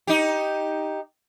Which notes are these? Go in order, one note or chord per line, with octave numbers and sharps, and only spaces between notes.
D#4 G4